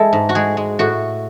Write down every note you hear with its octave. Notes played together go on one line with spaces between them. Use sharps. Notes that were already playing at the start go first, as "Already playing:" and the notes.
Already playing: E3 G#3 E4 A4
G#2
F#4
G#3 G#4
G#3
A2 F#4